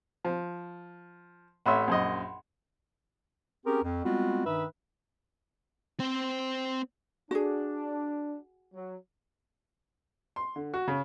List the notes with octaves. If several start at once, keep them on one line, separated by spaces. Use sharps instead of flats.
F3
A1 C#5 E5 F#5 B5 C6
A#1 F#2 D#5
C4 C#4 G4 G#4 A#4
F2
G3 G#3 B3 C4 F4 F#4
G2 D#3 D#4 B4 E5
C4 C5
D4 F#4 G#4
F#3
C6
D3
F#4
C#3